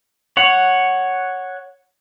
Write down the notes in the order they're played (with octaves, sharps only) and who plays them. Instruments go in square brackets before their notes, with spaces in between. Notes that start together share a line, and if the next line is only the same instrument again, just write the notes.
[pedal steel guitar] C#5 F#5